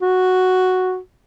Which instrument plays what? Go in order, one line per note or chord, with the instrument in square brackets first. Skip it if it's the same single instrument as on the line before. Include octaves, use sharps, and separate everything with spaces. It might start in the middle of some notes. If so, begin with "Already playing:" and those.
[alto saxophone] F#4